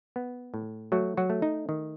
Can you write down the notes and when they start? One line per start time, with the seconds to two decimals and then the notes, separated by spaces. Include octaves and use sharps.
0.16 B3
0.54 A2
0.92 F#3 A3 F#4
1.17 F#3 F#4
1.30 A3
1.42 D#4
1.69 D#3